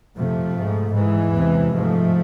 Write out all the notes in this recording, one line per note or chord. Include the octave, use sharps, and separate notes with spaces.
F2 C3 F3 A3
G#2
G#2 E3 G#3
E2 C3
G#2 F3 A3